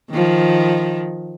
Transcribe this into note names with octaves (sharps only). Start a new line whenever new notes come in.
D#3 F3